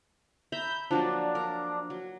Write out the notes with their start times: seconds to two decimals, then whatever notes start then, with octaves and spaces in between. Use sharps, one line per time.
0.52 E5 A#5 B5 G6
0.91 F3 F#3 A#3 D4
1.35 A#4
1.90 F#3